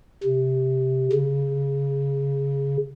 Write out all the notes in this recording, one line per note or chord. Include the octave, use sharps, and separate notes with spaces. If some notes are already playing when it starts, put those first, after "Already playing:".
C3
C#3